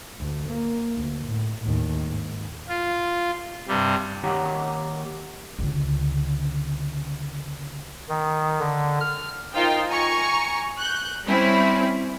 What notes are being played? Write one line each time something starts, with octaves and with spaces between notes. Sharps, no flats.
D2
A#3
D2
A2
D#2 A2
G#2
F4
G2 C3 G3
D#2 D#3 G4 C#5 F#5 A#5
C#2 D3
D#3
D3
F6
D#4 F4 A#4 C5 F5 G5
G#5 A#5 C#6
F#6 G6
G3 C4 C#4 E4